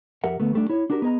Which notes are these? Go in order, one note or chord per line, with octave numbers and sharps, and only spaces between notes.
F2 G4 A#4 E5 F#5
D2 A3 B3
G3 A3 D4
E4 C#5
D4 F#4 G4 A#4
B3 G#4 A#4 D#5 A#5